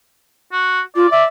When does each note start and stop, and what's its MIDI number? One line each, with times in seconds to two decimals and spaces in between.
0.52 0.80 66
0.96 1.07 65
0.96 1.09 74
1.11 1.24 74
1.11 1.23 76